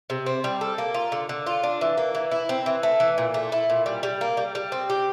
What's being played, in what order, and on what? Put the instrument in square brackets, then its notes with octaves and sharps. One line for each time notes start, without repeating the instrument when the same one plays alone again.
[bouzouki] C3
C4
G3
A4
A#3
F4
D3
D3
F4
D4
E3
A#3
E3
E4
C4
E3
A3
E3
A#2
A3
E4
A#2
G3
G3
A#3
G3
G3
C4
G4